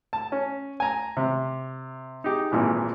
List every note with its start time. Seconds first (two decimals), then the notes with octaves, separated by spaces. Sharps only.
0.13 A5
0.32 C#4
0.80 G#5 A#5
1.17 C3
2.24 D#4 G4 G#4
2.52 G#1 A#2 E3